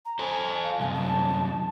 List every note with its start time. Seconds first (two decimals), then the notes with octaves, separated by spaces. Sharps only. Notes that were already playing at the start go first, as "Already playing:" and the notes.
0.05 A#5
0.19 A4 C5 G#5
0.63 F5
0.80 C2 F#2 G#5
0.93 A5